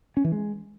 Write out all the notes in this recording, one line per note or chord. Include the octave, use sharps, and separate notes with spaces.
C#4
E3
G#3